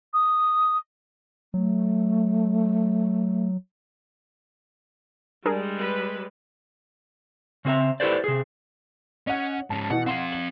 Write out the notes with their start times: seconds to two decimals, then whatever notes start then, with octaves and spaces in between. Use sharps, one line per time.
0.14 D#6
1.54 F#3 A3
5.46 G3 G#3 D4 G#4 A#4
5.79 B4
7.65 C#3 C4 G#4 E5 A#5
8.00 E4 G4 A4 B4 C5 D5
8.24 C3 G#4
9.27 C#4 D#5 F#5
9.70 G#2 C#4 A5
9.90 B2 E3 F#5
10.06 C4 F5 F#5 C6
10.32 F#7